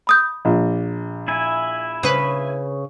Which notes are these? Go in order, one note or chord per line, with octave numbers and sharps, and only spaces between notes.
B5 D#6 G6
A#1
E4 G#5
C#3 B4